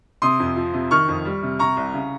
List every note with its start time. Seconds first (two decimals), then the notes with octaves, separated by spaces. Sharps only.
0.22 C3 C6 D#6
0.40 F2
0.56 F3
0.74 C3
0.91 D#3 C#6 F6
1.08 F2
1.25 G3
1.43 C3
1.59 C3 A#5 C#6
1.77 C2
1.94 C#3